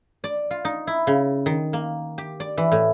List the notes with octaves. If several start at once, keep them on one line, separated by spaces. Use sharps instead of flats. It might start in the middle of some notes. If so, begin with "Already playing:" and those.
D5
F4
D#4
E4
C#3
D#3
A#3
G4
D5
E3
A2